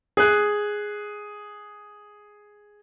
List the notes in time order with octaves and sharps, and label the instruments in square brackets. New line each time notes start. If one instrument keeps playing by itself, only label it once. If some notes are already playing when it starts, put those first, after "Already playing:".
[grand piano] G#4 F#6